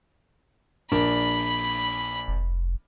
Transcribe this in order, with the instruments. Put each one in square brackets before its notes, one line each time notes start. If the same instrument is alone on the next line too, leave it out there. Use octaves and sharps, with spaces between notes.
[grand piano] A#1 D4 A#4 [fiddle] B5
[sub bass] F1